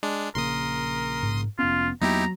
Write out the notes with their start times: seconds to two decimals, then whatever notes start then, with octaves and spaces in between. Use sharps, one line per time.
0.03 G#3 D4
0.35 A#1 C#3 A#3 A#4 C6 D#6
1.23 G#2
1.59 F1 B3 C#4 F4
2.01 E2 F#3 A#3 B3 D#4 E4 G4 A#5